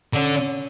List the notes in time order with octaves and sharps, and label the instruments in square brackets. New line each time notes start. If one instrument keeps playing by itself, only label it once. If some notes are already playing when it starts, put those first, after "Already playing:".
[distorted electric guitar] D3 [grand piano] C#4